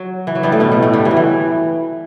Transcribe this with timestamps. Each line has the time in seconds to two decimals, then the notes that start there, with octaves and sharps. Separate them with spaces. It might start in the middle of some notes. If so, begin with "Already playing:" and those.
Already playing: F#3
0.27 E3
0.35 F#3
0.43 G2 G3
0.52 A2 A3
0.60 B2 B3
0.72 A2 A3
0.82 A2 A3
0.93 G2 G3
1.05 E3
1.11 F#3
1.17 E3